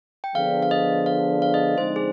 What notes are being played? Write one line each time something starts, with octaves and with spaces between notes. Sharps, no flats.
G5
D3 F3 B3 D4 G#4 F5
F5
D#5
F5
F5
D#5
D3 F3 G#3 C4 D#4 C5
G#4